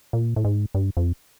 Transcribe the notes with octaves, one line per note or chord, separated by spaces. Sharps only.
A#2
A2
G#2
G2
F2